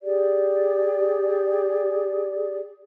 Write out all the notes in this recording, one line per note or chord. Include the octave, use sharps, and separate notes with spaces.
G4 G#4 D5